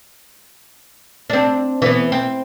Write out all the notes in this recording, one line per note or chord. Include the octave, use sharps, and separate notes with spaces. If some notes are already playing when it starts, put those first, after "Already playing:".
C4 D4
E3 B3
C4